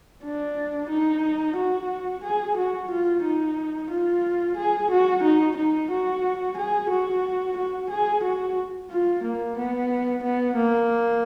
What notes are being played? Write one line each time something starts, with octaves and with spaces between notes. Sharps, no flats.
D4
D#4
F#4
G#4
F#4
F4
D#4
F4
G#4
F#4
D#4
D#4
F#4
G#4
F#4
F#4
G#4
F#4
F4
A#3
B3
B3
A#3